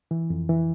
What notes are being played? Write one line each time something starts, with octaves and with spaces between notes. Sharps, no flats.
E3
F2
E3